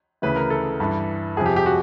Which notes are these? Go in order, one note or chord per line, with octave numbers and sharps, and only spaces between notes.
D2 C#3 E3 B4
A#4
A4
G2 E3
F2 C3 F3 G#4
G4
G4
F#4